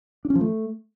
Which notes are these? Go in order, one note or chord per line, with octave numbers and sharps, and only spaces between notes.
D4
C#4
F3
A3